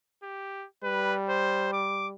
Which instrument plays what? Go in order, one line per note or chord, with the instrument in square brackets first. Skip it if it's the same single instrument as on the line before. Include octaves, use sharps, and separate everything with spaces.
[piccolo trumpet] G4
[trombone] G3 [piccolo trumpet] B4
[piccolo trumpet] C5
D6